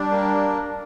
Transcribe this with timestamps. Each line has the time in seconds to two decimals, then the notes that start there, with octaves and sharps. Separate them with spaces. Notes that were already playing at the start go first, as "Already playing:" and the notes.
Already playing: G3 D4
0.11 A#3